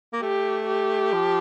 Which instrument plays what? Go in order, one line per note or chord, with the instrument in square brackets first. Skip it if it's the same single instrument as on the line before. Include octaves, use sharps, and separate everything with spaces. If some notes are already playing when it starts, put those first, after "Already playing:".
[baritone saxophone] A#3
[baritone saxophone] A3 [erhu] G4
[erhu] G4
[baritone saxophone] F3